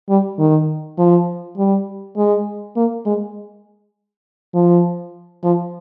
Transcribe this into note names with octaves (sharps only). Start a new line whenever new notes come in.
G3
D#3
F3
G3
G#3
A#3
G#3
F3
F3